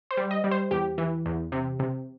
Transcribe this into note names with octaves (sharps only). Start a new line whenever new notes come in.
C5
G3
D#5
G3
C5
E2 G4
E3
E2
C3
C3